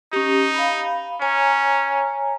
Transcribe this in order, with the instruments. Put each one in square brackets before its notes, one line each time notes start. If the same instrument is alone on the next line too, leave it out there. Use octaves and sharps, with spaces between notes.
[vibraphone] C#4 G4 [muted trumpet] D#4
[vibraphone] F5 B5
[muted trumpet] C#4 [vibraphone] C#5 G#5 A#5